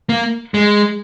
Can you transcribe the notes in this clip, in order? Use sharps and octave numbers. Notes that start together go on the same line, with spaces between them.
A#3
G#3